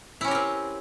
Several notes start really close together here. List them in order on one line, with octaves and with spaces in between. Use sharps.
E4 C#4 G4 A#4 C4